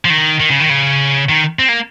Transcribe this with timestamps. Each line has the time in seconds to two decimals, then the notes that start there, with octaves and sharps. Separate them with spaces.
0.05 F3
0.10 D#3
0.40 D#3
0.50 C#3
0.60 D#3
0.70 C#3
1.29 D#3
1.59 C4
1.69 A#3